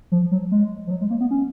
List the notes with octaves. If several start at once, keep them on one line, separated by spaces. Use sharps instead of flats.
F3
F#3
G#3
F3
F#3
G#3
A#3
B3
C#4